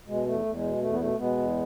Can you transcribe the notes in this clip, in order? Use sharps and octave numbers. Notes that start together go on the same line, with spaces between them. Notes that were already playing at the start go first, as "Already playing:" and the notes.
B2 G#3
E2 A3
E2
G#3
B2
E2 A3
B3
B2 A3
B2 G#3 B3
E2